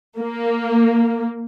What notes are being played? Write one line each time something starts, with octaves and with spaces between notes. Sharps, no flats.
A#3